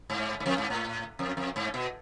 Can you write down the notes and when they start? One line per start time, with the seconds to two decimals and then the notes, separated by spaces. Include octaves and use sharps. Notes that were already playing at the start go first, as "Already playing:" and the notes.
0.10 G#2
0.40 G#2
0.46 F2
0.58 G#2
0.70 A2
1.19 F2
1.37 F2
1.56 G#2
1.74 B2